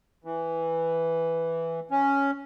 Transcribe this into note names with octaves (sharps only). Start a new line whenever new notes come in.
E3
C#4